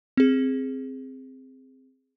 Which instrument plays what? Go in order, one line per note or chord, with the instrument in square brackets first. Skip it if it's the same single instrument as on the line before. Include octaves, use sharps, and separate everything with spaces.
[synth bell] C4 G#4